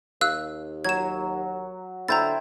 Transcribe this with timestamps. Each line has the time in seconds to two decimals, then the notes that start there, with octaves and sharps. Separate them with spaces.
0.21 D#2 F5 E6 F#6
0.85 F#3 G#6 E7
2.08 D3 E4 C5 G5 A#5 G6 A6